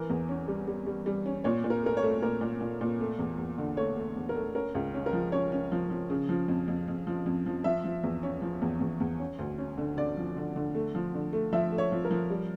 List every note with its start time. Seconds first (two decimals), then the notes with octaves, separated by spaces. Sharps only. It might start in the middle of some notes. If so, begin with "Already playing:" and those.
Already playing: E3 A#4
0.10 E2
0.29 C#4
0.48 G3
0.68 G3
0.87 G3
1.06 G3
1.26 C#4
1.44 A#2 C#5
1.64 A#2
1.70 A#4
1.83 A3 A#4
1.97 C#5
2.03 A3
2.22 A#2 A#4
2.41 A#2
2.61 A#2
2.81 A#2
3.00 A3
3.19 E2
3.38 E2
3.58 D3
3.77 A3 C#5
3.97 A3
4.16 E2
4.29 A#4
4.35 A3
4.55 C#4 A#4
4.75 C#2
4.94 C#4
5.06 A#4
5.13 F3
5.32 C#4 C#5
5.52 C#4
5.72 F3
5.90 F3
6.10 C#3
6.29 F3
6.48 F2
6.68 F2
6.88 F2
7.07 F3
7.26 F2
7.46 F3
7.64 F3 E5
7.84 F3
8.03 E2
8.23 C#4
8.42 F3
8.62 E2
8.81 E2
9.00 E2
9.19 C#4
9.39 D2
9.58 C#4
9.78 D3
9.97 D3 D5
10.17 F3
10.37 D3
10.56 D3
10.75 A3
10.95 F3
11.14 D3
11.33 A3
11.53 F3 E5
11.72 A3
11.78 C#5
11.92 F3
12.05 A#4
12.11 F3
12.30 G3